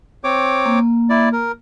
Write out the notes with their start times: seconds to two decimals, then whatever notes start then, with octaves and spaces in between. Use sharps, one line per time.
0.24 C4 C#5 D6
0.66 A#3
1.10 E4 D5
1.33 A#4